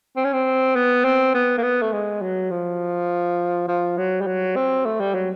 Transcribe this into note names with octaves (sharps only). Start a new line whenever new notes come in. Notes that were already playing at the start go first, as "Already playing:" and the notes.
C4
C#4
C4
B3
C4
B3
A#3
B3
A3
G#3
F#3
F3
F3
F#3
G3
F#3
C4
A3
G3
F#3